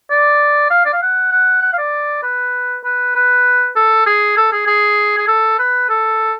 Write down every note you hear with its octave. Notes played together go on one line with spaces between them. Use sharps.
D5
F5
D5
F5
F#5
F#5
F#5
F5
D5
B4
B4
B4
A4
G#4
A4
G#4
G#4
G#4
A4
B4
A4